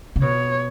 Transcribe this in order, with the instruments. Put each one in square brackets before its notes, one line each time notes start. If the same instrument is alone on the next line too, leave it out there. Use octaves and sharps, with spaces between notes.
[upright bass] C#3
[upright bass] B2 [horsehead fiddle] C#5